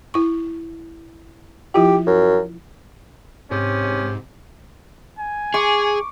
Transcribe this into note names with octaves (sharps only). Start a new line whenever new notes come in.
E4 C#6
F3 E4 F4 G4
F#2
G#2 C3 C#4
G#5
G#4 C#6 D6